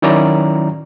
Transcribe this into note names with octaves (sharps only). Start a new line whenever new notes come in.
D#3 F#3 C#4 E4 D5 A#5